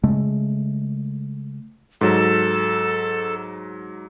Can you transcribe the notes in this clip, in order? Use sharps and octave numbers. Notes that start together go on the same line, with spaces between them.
C#3 G#3 A3
G#2 F#3 A4